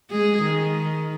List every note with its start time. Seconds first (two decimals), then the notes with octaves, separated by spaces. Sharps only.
0.10 G#3 G#4
0.42 D#3